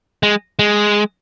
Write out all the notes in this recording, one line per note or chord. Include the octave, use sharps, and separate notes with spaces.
G#3
G#3